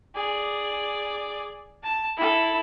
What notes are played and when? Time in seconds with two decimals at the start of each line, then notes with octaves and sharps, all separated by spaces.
0.15 G#4 D5
1.83 A5
2.17 E4 A4